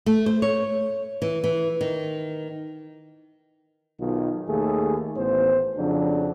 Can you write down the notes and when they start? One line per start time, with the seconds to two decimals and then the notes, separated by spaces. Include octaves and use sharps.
0.06 A3
0.26 C5
0.42 C#5
1.22 E3
1.44 E3
1.81 D#3
4.00 B1 B2 D#3 F4
4.48 D#2 A3 G#4
5.17 A1 B3 C5
5.77 F2 C#3 F#3 D4